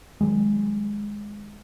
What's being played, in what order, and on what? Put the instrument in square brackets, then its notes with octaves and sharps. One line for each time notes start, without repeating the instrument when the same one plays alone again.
[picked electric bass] D#3 F#3 G#3